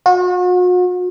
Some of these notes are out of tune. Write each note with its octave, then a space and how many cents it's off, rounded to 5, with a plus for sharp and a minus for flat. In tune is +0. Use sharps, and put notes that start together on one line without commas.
F#4 -40